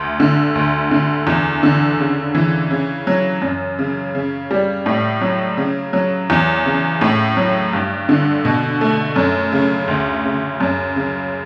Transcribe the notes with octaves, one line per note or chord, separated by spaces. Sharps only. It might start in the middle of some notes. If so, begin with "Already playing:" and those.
Already playing: D2
D3
D2
D3
E2
D3
C#3
E3
C#3
F#3
F#2
C#3
C#3
G3
A2
F#3
C#3
F#3
E2
C#3
A2
F#3
G2
D3
B2
A3
F#2
C#3
D2
C#3
F#2
C#3